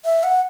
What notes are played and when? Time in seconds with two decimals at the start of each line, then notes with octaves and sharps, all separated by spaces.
0.05 E5
0.24 F#5